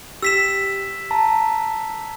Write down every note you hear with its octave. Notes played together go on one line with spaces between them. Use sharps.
G4 E6 B6 E7
A5 A#5